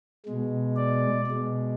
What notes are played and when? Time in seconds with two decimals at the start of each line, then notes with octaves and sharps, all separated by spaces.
0.26 B2 G#3
0.76 D5
1.27 B2 G#3